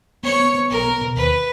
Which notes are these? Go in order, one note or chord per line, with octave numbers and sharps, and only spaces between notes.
B3 C#5
B3
B3
B1 A#4
B3
B2
D#2 B4